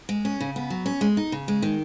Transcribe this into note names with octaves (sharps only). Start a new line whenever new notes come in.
G#3
C#4
C#3
B3
F#3
C#4
G#3
D#4
C#3
G#3
D#3